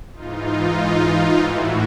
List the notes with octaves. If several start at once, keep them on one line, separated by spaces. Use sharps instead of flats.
G#2 E3 D#4 F4
D#4 F4
D#4 F4
D#4 F4
A2 E3 E4 F#4